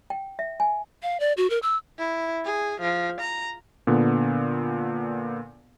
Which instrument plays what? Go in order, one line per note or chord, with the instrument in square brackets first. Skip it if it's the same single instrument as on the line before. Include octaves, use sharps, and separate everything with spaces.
[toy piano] G5
E5
G#5
[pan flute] F5
D5
F#4
A#4
E6
[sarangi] E4
G#4
F3
A#5
[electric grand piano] A#2 D3 B3